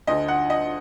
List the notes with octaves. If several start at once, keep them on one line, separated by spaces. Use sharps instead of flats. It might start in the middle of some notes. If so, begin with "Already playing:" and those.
D2 D3 D#5
F#5
D#5